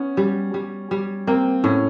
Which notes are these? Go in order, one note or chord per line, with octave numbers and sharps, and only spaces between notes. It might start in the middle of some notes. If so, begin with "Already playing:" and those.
Already playing: B3 C#4
G3
G3
G3
A#3 C4
A2 C#4